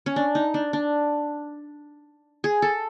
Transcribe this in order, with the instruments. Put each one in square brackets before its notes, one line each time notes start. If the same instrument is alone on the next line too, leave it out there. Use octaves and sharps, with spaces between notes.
[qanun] C#4
D4
D#4
D4
D4
G#4
A4